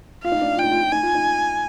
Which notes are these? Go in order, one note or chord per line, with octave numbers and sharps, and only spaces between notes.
F4 F5
D#4
D4
F4 G5
D#4
F4
F4
D#4 G#5
F4
D#4